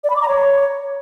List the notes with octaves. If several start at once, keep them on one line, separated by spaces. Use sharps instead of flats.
D5
B5
D6
A#5
C#5